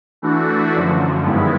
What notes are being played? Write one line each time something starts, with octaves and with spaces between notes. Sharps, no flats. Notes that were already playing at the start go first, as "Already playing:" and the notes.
E3 A3 D4 F#4
F#2 D3 F3
G2 D#3 G#3 B3 E4